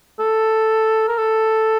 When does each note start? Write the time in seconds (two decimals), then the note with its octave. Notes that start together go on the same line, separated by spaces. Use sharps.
0.19 A4
1.08 A#4
1.18 A4